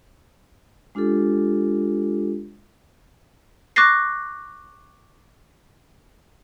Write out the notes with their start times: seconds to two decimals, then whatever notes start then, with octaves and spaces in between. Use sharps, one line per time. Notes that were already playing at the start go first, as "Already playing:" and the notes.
0.95 G#3 D4 F4 G4 A4
3.76 C#6 D6 F#6 A6 A#6 C7